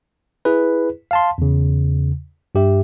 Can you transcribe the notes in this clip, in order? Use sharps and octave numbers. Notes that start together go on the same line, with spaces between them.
E4 G#4 B4
F5 A5 C6
E2 C#3
G2 G4 E5